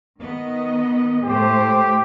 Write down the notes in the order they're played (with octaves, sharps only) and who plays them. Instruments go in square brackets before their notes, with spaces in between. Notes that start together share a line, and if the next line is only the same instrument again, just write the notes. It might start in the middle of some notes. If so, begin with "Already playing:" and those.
[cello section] D#3 B3 D#5
[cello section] A2 A3 C5 [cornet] G4